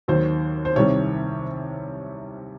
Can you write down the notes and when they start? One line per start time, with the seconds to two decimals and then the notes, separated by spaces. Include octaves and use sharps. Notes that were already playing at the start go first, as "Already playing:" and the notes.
0.08 D#2 D#3 F#3 C5
0.65 C5
0.75 C2 C3 D#3 G3 C#5